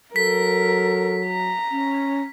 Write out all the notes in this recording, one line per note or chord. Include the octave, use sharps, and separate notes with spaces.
F#3 A4 A#4 B6
A#5
C#4